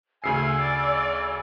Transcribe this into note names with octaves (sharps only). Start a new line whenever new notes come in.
D2 C#3 G#5 E6 C7
D5